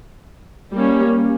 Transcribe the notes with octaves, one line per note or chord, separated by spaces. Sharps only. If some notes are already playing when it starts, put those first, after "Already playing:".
G3 A#3 C#4